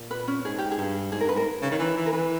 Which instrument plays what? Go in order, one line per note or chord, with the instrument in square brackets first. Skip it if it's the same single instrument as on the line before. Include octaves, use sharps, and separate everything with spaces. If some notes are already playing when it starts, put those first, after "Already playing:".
Already playing: [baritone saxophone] A#2
[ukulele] B4
C#4
[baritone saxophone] G#2 [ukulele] G#4
[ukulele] G4
G#4
[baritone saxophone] G2
[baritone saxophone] G#2 [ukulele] G#4
[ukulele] A#4
[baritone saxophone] G2
[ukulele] B4
[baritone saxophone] G#2 [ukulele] A#4
[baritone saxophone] C#3
D#3
E3
E3
[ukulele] A#4
[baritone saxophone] E3 [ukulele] B4